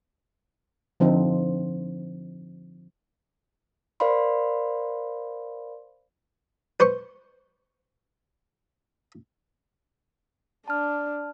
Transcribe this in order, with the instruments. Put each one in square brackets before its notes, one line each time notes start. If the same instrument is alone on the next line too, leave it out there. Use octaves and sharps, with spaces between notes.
[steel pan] D3 F3 C4 D#4
[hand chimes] A#4 C5 D5 F5 B5 C6
[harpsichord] B4 C5 C6 C#6
[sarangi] D4 [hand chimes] A5 F6